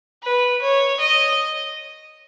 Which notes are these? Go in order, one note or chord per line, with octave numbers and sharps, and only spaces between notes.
B4
C#5
D#5